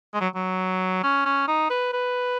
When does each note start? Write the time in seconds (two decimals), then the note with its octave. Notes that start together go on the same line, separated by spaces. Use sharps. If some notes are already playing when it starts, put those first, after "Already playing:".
0.14 G#3
0.21 F#3
0.35 F#3
1.03 C#4
1.25 C#4
1.48 D#4
1.70 B4
1.93 B4